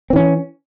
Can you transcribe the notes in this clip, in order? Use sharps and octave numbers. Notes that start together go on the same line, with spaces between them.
E3 C4 C#4